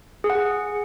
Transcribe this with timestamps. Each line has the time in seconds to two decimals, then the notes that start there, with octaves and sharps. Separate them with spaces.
0.24 G#4
0.30 F#5
0.35 G#4